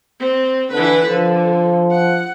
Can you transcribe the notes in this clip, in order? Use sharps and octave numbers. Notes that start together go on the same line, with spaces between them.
C4
D3 E3 B4
D3 F3
F#5